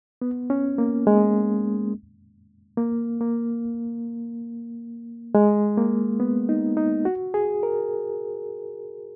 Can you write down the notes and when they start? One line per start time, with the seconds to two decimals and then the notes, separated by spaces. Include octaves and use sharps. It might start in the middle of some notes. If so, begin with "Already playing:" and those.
0.22 B3
0.50 C#4
0.78 A#3
1.07 G#3
2.78 A#3
3.21 A#3
5.35 G#3
5.77 A#3
6.20 B3
6.49 D#4
6.77 D#4
7.05 F#4
7.34 G#4
7.63 A#4